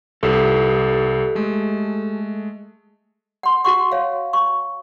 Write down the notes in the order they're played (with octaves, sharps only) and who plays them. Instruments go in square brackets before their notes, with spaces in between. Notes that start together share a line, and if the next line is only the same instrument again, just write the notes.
[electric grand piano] C2 [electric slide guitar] G4 A4
[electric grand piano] G#3 A3
[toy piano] F#5 C6
F#4 F#5 C#6
C#5 F5
C#6